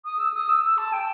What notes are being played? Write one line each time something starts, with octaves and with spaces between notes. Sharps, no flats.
D#6
E6
D#6
E6
E6
A5
G5